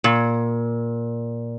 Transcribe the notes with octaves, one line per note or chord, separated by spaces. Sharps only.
A#2